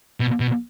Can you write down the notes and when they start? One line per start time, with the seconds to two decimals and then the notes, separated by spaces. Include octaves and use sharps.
0.20 B2
0.40 B2